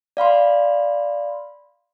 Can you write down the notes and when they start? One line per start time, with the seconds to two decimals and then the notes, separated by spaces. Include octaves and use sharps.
0.17 D5 F5 B5 C6